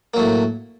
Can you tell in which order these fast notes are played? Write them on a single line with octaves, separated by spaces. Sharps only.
A#3 F#3 A2